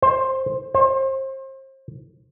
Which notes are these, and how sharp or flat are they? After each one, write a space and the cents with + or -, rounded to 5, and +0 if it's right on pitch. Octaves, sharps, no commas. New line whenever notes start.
C5 +15
C5 +35